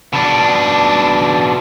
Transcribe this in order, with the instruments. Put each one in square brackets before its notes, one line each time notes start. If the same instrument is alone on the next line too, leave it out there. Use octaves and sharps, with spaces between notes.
[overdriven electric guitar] B2 D4